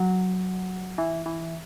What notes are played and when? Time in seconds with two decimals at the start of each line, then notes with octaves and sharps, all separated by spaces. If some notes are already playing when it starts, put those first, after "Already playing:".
Already playing: F#3
0.98 E3
1.26 E3